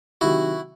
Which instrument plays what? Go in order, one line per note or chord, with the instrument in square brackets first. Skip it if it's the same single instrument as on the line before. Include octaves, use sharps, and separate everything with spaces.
[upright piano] C3 D#3 F#3 [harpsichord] E4 F#4